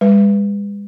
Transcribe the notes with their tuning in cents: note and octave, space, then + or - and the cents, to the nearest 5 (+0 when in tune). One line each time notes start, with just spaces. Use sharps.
G#3 -45 B4 +0